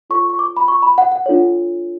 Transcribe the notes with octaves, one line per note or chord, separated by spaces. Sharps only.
F4 A4 C#5 C#6
C#6
D6
B5
C#6
B5
F#5
F#5
D4 F4 A4 C#5